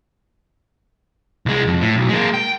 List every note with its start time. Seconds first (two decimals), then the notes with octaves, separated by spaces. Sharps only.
1.46 C2 G#3
1.67 F2
1.81 A2
1.96 B1
2.09 G#3 A#3
2.34 G5